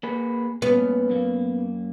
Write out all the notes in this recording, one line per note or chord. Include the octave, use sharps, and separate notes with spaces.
A#3 G#4 B4
G2 A#2 B3 C#4
F#2 A#3